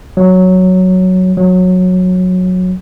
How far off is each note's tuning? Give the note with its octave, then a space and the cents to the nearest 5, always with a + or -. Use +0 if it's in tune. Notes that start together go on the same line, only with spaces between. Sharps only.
F#3 +0
F#3 -15